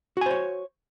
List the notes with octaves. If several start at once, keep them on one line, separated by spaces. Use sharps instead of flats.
F#4 C5 C#5 G#5